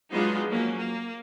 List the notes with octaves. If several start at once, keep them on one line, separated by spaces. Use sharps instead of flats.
F#3 G#3 B3 D4 D#4 F4
F3 F#3 A#3 C#4
A#3